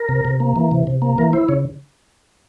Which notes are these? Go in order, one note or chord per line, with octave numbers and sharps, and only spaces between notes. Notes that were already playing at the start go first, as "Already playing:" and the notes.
Already playing: A#4
C3
C3
A#3
E3
C3
C3
A#3
E3 A#4
E4 C5
C#3 C#5